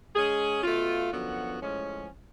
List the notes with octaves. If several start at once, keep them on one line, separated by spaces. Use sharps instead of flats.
G#3 C#4 G#4
B2 A3 F4
F#2 D3 F3 B3 F#4
A2 F3 G#3 C#4